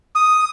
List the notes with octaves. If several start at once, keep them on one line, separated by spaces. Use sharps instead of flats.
D#6